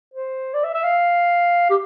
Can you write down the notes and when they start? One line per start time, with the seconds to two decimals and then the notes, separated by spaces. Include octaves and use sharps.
0.14 C5
0.54 D5
0.64 E5
0.74 E5
0.84 F5
1.70 G4